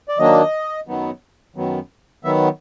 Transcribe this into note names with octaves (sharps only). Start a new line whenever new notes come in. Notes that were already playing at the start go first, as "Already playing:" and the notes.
D5
D#3 F#3 A#3 D4 D#5
F#2 D#3 F#3 B3
F#2 D#3 F#3 B3
D#3 F#3 B3 E5